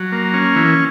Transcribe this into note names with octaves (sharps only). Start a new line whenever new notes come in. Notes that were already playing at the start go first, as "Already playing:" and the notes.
Already playing: F#3
A#3
C#4
E3